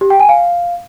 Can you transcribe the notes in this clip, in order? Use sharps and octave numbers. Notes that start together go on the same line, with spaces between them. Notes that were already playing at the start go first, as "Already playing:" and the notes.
G4
G5
G#5
F5